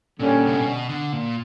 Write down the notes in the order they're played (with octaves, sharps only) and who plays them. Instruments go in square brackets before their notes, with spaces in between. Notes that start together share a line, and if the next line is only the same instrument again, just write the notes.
[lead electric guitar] A#2 [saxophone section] D3 G3 C#4
[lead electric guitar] C#3
B2
D3
A#2